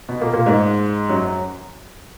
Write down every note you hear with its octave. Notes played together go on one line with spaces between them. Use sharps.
B2 B3
A#2 A#3
A#2 A#3
G#2 G#3
F#2 F#3